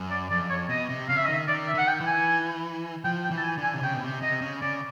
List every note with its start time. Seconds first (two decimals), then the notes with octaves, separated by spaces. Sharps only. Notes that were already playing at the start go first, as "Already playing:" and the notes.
Already playing: F#2
0.11 D5
0.31 F2 D5
0.50 C#5
0.69 B2 D#5
0.89 C3
1.09 C#3 F5
1.17 E5
1.25 D#5
1.28 D#3 E5
1.48 D#3 D5
1.68 E5
1.74 D#3 F#5
1.87 G5
2.00 E3
2.07 G#5
3.04 F3 G5
3.24 G5
3.31 E3
3.38 A5
3.44 G#5
3.58 D3
3.63 G#5
3.74 C3
3.83 C#3 G5
3.94 B2
4.03 C3
4.22 C3 D#5
4.41 C#3
4.62 C#3 D5